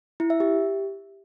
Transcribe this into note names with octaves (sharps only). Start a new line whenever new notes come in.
E4
E5
G4